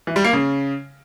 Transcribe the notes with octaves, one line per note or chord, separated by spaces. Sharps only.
E3
G3
A#3
C#3